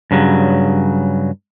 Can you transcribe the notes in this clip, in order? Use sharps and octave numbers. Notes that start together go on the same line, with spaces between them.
G2 C#3 F#3